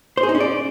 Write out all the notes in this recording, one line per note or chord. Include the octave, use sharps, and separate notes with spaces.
C5
G#4
D#4
C#4
D5